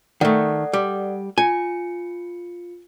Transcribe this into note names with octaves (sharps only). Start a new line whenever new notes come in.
D#3 A3 A4 D5 F#5
G3
F4 G#5 C#7